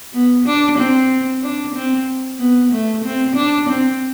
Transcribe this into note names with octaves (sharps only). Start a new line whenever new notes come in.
B3
D4
C4
D4
C4
B3
A3
C4
D4
C4